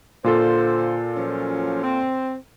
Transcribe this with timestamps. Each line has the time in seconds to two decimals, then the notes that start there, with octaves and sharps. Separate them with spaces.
0.24 A#2 D3 F4 A4 C5
1.15 F3 F#3 C#4
1.82 C4